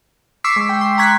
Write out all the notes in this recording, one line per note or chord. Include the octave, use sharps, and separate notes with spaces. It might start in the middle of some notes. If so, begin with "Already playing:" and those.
C#6 D6 E6 B6 C7
G#3
G5
C6
A#5 C6 C#6 F#6 G#6 B6